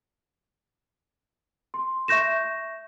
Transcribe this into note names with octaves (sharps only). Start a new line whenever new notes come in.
C6
E5 C#6 G6 A#6 E7